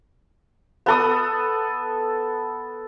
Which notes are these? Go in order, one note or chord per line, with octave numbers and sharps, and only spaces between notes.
B3 A4 D#6